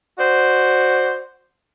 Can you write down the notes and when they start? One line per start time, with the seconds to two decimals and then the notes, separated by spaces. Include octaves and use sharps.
0.18 F#4 C5 D5